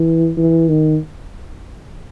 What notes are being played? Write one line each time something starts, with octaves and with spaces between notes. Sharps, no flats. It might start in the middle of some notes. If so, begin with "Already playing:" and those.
Already playing: E3
E3
D#3